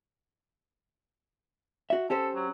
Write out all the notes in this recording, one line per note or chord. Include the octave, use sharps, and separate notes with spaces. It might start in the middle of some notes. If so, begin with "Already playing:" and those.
F#4 E5
C#4 G4 A4 C5
F#3